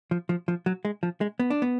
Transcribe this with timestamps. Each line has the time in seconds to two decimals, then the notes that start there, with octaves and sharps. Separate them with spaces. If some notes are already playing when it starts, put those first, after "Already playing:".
0.11 F3
0.29 F3
0.48 F3
0.66 F#3
0.85 G#3
1.03 F3
1.21 G#3
1.40 B3
1.50 D4
1.62 B3